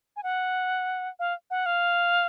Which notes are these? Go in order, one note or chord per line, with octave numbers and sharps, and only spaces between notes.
G#5
F#5
F5
F#5
F5